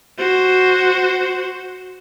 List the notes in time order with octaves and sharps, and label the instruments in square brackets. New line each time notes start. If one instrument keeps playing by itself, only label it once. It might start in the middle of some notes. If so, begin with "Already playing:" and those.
[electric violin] F#4 C5